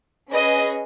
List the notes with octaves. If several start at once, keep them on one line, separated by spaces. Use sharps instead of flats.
C#4 G#4 B4 D#5